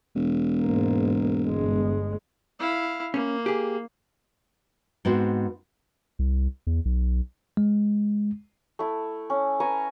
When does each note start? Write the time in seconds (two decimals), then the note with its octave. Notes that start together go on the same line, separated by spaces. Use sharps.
0.15 E1
0.60 G#2 A#3
1.48 G1 G#3
2.59 E4 F5
3.14 A#3 C#4
3.46 G4 G#4
5.05 G#2 B3 C4 F#4 C5
6.19 C2
6.67 E2
6.85 B1
7.57 G#3
8.79 A3 E4
9.30 C#4
9.60 B4 G#5 A#5 C#6